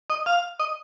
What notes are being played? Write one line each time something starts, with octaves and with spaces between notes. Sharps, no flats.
D#5
F5
D#5